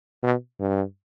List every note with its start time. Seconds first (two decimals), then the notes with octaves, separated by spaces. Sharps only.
0.23 B2
0.60 G2